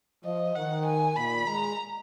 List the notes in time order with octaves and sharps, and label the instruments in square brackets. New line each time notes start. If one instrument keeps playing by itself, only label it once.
[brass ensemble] F3 [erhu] D#5
[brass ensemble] D#3 [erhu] F#5
[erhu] G#5
[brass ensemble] A#2 [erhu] B5
[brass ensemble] G#3 [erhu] A#5